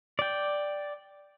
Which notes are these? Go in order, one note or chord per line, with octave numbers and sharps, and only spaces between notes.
D5 G5